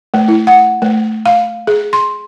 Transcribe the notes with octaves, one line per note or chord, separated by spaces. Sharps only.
A3
E4
F#5
A3
F5
G#4
C6